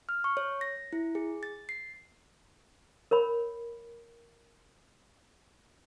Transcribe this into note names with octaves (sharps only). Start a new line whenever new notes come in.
F6
C#6
C#5
A#6
E4
G#4
A6
C7
A#4 C#5 B5